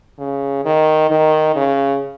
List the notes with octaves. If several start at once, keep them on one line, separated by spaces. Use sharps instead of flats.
C#3
D#3
D#3
C#3